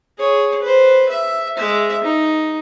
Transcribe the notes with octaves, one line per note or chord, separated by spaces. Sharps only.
G#4 C#5
B4 C5
E5
G#3 E5
D#4